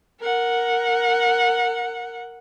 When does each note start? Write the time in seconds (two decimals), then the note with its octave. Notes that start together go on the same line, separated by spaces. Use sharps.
0.21 A#4 F#5